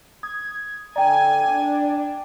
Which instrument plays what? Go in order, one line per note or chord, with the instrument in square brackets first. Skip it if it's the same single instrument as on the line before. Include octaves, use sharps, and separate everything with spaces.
[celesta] D#6 [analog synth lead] G#6
[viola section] D3 G#5 [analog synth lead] D5 [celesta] G5 A#5
[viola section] D4